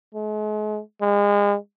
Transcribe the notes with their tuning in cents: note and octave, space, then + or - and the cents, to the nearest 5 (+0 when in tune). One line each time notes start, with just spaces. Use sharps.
G#3 +40
G#3 -35